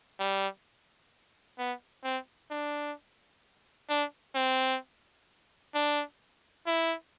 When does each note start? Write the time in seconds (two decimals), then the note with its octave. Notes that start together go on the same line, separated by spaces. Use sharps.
0.19 G3
1.59 B3
2.04 C4
2.50 D4
3.90 D4
4.35 C4
5.75 D4
6.67 E4